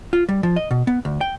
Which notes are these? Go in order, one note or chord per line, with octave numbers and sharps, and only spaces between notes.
F4
G3
F3
D#5
B2
B3
D2
G5